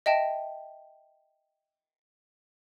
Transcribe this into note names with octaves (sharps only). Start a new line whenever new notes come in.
D#5 E5 G5 A5 A#6